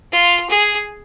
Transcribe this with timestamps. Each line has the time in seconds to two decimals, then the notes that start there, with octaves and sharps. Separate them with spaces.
0.12 F4
0.49 G#4